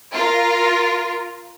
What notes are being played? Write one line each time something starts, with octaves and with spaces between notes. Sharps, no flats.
F4 A#4